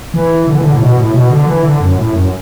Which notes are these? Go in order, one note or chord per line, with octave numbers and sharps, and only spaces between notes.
E3
D3
E3
D3
A2
B2
A2
B2
D3
E3
D3
F#2
A2
F#2